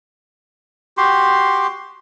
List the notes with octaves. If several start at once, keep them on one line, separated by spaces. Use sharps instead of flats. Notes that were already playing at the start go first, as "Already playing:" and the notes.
F#4 G4 C6